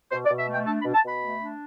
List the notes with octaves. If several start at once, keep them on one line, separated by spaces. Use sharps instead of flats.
B2 C5
D5
B2
E5
A3 G5
D4 A5
B5
B2
A5
B2 B5
A3
D4